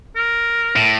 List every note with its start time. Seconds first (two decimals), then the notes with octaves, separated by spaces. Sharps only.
0.16 A#4
0.76 A2